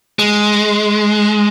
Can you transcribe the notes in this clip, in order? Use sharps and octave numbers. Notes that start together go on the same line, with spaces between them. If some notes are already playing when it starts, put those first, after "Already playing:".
G#3